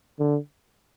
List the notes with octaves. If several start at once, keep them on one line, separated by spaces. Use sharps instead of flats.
D3